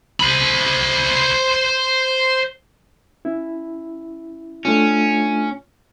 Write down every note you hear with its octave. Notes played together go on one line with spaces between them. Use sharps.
C5 B5
C#4 E4
A3 C#4 D4 F4